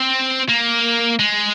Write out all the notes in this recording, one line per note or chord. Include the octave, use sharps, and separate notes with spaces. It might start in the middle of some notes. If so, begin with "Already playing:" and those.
Already playing: C4
A#3
G#3